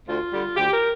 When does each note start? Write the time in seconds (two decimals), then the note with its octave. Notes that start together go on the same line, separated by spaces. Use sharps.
0.08 D2 F4
0.32 D3 G3
0.56 D2 G4
0.73 A#4